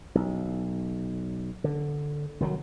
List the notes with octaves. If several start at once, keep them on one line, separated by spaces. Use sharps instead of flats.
B1
D3
C2 D#3 E3 F#3